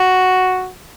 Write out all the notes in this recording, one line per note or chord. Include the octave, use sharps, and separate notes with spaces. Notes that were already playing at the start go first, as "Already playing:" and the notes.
Already playing: F#4